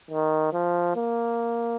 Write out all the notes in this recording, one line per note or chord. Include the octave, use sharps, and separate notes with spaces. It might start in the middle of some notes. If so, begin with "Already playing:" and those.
D#3
F3
A#3